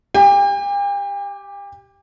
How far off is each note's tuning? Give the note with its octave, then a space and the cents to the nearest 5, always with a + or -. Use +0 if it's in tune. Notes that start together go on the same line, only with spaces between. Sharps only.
G4 +0 G5 +45